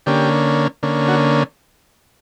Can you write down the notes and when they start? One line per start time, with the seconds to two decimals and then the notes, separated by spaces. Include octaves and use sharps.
0.06 D3 A#3 C#4 G4
0.83 D3 A#3 C#4
1.08 F#4